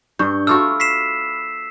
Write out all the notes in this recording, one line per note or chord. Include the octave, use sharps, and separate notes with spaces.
G2 D4 C#6 G6
A3 F4 F#4 B5 D6 E6 F6
B6 C7 E7